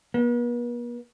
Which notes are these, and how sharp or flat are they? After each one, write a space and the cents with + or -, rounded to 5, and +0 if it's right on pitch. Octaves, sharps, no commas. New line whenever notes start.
B3 -45